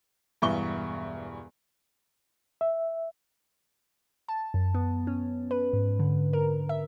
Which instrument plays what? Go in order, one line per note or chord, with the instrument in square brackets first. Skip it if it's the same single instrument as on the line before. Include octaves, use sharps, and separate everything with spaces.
[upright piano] E1 G2 E3 E5 C#6 G7
[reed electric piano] E5
[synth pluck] A5
F#2
B3
C#4
B4
G#2
D3
A#4
E5